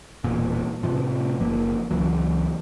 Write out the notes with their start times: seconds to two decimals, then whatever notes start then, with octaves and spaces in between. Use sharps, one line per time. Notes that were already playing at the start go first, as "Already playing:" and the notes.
0.24 E1 E2 A#2
0.83 A2 C3 F3
1.40 F#1 F3 A#3
1.91 C#2 E3 F#3